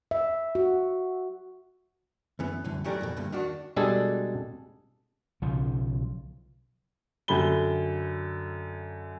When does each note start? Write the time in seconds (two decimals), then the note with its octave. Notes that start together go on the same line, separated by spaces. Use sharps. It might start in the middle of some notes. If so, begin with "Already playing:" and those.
0.11 E5
0.55 F#4
2.39 F#2 E3 B3
2.64 C2 F#2 A2 D3
2.84 E3 F#3 A3 G4 A#4 D5
3.01 F2 G#2 B2
3.17 E2 G2 D3 A#3
3.32 D#3 D4 F#4
3.76 B2 G3 G#3 D4 G#4 A4
5.42 B1 C#3 F3
7.28 F#2 D3 G5 B5 G7